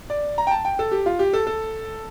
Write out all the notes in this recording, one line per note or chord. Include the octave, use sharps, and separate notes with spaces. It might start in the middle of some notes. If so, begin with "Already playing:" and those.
D5
A#5
G5
A5
G5
A4
G4
F4
G4
A4
A4